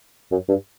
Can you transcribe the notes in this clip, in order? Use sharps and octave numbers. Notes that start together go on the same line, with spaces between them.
F#2
G2